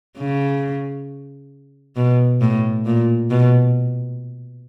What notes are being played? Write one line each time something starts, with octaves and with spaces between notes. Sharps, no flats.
C#3
B2
A2
A#2
B2